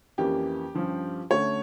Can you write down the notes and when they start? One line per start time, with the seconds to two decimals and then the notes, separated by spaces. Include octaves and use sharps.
0.18 F2 E3 A#3 C#4 G4
0.75 G2 F3 C#4
1.30 D2 D3 A3 C#4 C#5